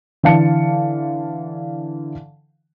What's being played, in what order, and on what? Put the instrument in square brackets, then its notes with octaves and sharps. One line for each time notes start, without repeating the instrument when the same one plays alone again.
[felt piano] D3 E3 F5 A5 C#7